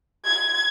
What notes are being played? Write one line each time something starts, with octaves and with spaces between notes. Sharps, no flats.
G#6